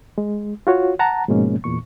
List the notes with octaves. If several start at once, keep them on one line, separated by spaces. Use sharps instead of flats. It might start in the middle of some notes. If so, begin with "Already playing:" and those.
G#3
F4 F#4 C#5
F#5 A5 A#5
G#2 B2 F3 G#3 A#3 C#4
E2 A#2 C#6